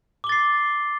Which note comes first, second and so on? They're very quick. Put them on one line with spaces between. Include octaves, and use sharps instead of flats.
D6 G7 A6 C7